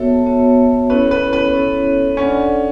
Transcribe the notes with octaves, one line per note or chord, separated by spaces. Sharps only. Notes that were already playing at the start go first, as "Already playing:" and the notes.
Already playing: B3 F#4 A4 C#5 E5
B3 F#4 C#5 E5
C#4 E4 A4 B4 C#5
B4
B4
C#4 E4 A4 C#5
C#4 D4 A4 D5 F#5